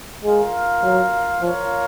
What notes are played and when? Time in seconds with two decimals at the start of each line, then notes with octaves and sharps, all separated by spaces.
0.24 G#3 F4 A#4 F5
0.83 F#3
1.41 F3 F4 A#4 C#5 F5